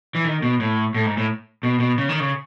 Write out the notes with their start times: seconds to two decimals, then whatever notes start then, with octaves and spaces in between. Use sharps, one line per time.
0.15 E3
0.25 D#3
0.42 B2
0.60 A2
0.94 A2
1.06 G#2
1.17 A2
1.63 B2
1.80 B2
1.98 C#3
2.09 D#3
2.20 C#3